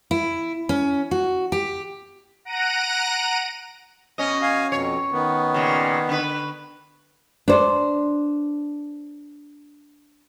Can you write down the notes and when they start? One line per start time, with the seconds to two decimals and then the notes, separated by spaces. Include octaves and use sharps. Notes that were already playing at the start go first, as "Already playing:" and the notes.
0.11 E4
0.69 C#4
1.11 F#4
1.52 G4
2.45 F#5 A#5 F#6 A#6 D7 D#7
4.18 B2 C#4 D#5
4.42 F5 G#5
4.72 F2 B2 C#5
5.12 D#3 B3
5.54 A#2 C#3
6.09 D3 B4
7.48 D4 C5